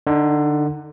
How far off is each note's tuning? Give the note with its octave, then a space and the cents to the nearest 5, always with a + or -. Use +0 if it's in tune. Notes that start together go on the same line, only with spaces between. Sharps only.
D3 +20 D#4 +0